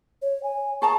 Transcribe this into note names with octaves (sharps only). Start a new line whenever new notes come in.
C#5
G#5
G#4 A5 A#5 C#6